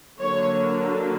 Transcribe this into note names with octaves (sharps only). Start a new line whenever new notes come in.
D3 F#3 A#3 D4 C#5